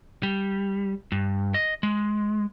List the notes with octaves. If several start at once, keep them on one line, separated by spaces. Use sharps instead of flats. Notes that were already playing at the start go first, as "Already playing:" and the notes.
G3
G2
D#5
G#3